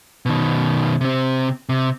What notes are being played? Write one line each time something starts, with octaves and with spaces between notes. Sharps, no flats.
B2 D#3
C3 C4
C3